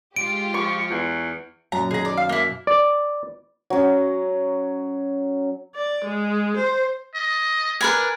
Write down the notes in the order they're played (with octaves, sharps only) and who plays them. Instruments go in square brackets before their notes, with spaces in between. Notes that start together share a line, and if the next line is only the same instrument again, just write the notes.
[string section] G#3 F4 G4 [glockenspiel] D7
[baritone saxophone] F3 [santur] C#6
[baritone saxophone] E2
[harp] F#2 A#2 [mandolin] A#5
[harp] B2 D#3 D#6 [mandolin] G#4 A#5
[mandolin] D5
[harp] E5 [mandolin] F5
[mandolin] A#3 E4 [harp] B3
[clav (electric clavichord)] D5
[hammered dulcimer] F#3 C#4
[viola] D5
G#3
C5
[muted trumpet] D#5
[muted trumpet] D4 [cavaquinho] A#4 B4 G#5